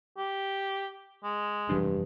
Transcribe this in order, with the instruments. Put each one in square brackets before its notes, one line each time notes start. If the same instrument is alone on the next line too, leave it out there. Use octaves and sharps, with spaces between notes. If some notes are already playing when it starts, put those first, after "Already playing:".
[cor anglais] G4
G#3
[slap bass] F1 E3 D4 [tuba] G2